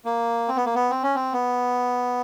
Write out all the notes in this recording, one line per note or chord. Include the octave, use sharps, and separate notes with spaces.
A#3
C4
B3
A#3
B3
C4
C#4
C4
B3